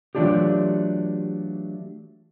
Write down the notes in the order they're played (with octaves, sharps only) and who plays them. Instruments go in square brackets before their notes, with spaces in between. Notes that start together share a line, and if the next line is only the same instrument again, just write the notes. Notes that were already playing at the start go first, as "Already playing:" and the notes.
[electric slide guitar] E3 F#3 A3 D4 F4 G4